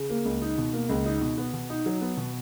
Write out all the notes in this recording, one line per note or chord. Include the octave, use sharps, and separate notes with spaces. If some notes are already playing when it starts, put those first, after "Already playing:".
Already playing: C#3
A#3
C#2
D#4
B2
A#3
C#2
D#4
B2
B3
B2
D#4
F#3
B3
B2